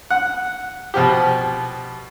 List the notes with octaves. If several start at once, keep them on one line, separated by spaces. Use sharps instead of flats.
F#5
B2 F3 G4